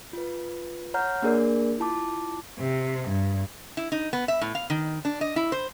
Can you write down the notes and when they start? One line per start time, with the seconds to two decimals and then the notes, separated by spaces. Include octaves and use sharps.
0.13 F4 B4
0.94 C#5 F#5 A#5 F6 G6
1.22 A#3 D4 G#4 A#4 D5
1.78 E4 F4 A5 D6
2.58 C3
3.09 G2
3.77 E4
3.92 D#4
4.13 B3
4.28 E5
4.41 A2
4.55 F5
4.70 D#3
5.05 D4
5.21 D#5
5.36 E4
5.52 C5